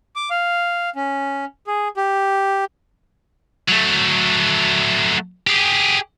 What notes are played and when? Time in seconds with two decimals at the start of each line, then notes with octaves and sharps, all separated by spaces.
0.16 D6
0.30 F5
0.96 C#4
1.67 G#4
1.97 G4
3.68 F#3 A3
5.47 G4 G#4